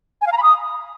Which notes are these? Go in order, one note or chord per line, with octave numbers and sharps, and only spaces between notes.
G#5
F5
A#5
B5
D#6